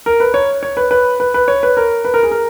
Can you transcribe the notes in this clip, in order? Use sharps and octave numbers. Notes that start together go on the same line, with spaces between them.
A#4
B4
C#5
C#5
B4
B4
B4
B4
C#5
B4
A#4
B4
A#4
G#4
A#4